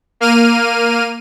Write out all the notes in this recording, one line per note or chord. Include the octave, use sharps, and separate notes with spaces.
A#3 F6 D#7